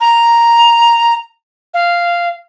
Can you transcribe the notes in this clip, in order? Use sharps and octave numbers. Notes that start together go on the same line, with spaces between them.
A#5
F5